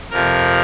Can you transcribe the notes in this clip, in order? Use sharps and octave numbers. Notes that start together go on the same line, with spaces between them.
F2 C3 F3 A#4